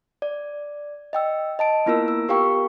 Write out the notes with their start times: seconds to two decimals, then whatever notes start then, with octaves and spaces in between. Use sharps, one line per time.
0.22 D5
1.13 D#5 G5 E6
1.59 D#5 A5 D7
1.86 A#3 B3 E4 F4 A#4 E6
2.08 E6
2.28 B3 G4 A#4 F5 G5 C#6